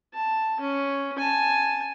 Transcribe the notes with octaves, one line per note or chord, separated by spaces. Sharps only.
A5
C#4
G#5 A5